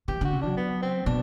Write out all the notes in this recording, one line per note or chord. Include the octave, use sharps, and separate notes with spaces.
E3 G4
D3 F#4
C3
F#3 D4
B3
C4
B2 D4